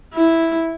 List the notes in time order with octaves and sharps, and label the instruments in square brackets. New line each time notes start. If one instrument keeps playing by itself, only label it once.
[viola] E4